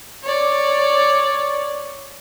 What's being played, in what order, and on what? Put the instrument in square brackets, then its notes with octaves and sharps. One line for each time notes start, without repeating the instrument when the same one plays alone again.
[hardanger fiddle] C#5 D5